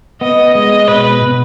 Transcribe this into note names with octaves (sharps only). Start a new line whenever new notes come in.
B3 D#5
G#3 D#5
B2 B4
B2